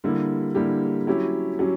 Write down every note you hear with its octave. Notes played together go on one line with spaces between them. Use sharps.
D3 G3 A#3 E4 G4
D3 G3 A#3 E4 G4
F#3 C#4 E4 G4
F#3 C#4 G4